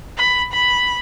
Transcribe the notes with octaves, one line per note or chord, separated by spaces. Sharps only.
B5
B5